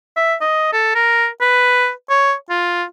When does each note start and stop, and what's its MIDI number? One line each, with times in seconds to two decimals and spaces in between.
0.16 0.34 76
0.41 0.73 75
0.73 0.95 69
0.95 1.27 70
1.41 1.91 71
2.10 2.34 73
2.50 2.84 65